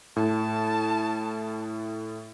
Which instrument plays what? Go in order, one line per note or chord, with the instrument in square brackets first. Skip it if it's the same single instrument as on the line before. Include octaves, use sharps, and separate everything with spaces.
[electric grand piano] A2 [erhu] A5